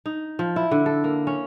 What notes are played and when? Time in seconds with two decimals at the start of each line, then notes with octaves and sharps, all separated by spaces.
0.06 D#4
0.39 F3
0.56 E4
0.71 D3
0.86 A4
1.04 A#3
1.27 C#4